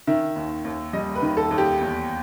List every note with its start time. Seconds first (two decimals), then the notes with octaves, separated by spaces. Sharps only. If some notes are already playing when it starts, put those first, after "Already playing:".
0.07 D#3 E5
0.36 D#2
0.65 D#2
0.93 G3 D#5
1.15 B4
1.22 D#3
1.37 A4
1.51 D#2
1.58 G4
1.80 E2